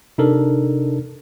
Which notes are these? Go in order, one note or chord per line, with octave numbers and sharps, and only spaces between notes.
C3 D4 D#4 A4 A#4